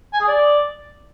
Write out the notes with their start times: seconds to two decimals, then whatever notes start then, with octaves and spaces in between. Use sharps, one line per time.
0.13 G#5
0.20 G#4
0.28 D5